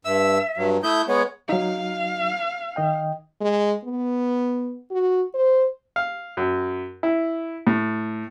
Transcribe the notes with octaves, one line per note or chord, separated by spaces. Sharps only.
G2 E5 E6
G2 F#3
A3 E4 D#6 G6
G#3 B3 C#5
F#3 D#4 F5
D#3 D#5 G5
G#3
B3
F#4
C5
F5
F#2
E4
A2